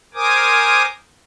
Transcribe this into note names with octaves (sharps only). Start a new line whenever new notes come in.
A#4 C5 G#5 D6 D#6